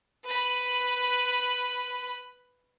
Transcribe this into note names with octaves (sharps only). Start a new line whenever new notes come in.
B4 B5